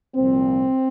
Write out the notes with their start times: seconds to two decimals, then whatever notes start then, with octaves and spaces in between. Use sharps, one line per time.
0.15 C2 A#2 F3 C4